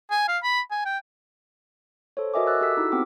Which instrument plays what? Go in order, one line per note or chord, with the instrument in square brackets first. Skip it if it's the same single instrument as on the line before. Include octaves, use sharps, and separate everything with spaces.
[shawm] G#5
F5
B5
G#5
G5
[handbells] A4 C5 C#5
F#4 A#4 D#5 E5 G#5 D6
D6 E6 F#6 A6
G4 A4 E6 B6
D#4 E4 F#4
B3 C4 F#4 G4 D6